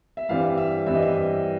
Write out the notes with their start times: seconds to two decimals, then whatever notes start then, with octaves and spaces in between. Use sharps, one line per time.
0.17 E5
0.29 G2 E3 G3 C4 F5
0.58 E5
0.86 G2 E3 G3 C4 E5
0.95 D#5
1.03 E5